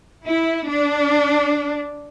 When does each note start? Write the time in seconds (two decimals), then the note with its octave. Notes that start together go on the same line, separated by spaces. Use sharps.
0.24 E4
0.67 D4